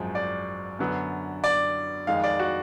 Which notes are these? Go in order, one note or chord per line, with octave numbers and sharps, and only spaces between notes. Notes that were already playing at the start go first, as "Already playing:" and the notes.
Already playing: G#1 F#2 F3 G#3
D5
F#2 D3 F#3 B3
D5
F2 D#3 G#3 F5
D5
F#4